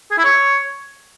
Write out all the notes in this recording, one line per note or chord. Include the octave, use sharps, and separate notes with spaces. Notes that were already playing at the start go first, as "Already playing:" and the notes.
G#4
E4
C#5